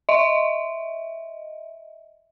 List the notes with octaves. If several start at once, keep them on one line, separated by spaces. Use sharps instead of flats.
D#5 E5